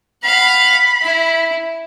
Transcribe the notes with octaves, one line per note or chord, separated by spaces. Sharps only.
F5 F#5 B5
E4